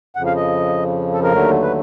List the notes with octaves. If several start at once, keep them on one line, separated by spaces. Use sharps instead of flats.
F2 C#3 F3 F#5
F5
D#5
A4
A#4
D#2 D3 F#3 A3
B4